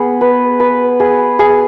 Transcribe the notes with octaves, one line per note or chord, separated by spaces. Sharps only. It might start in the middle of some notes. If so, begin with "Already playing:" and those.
Already playing: B3 G#4
B4
B4
G#4
G#4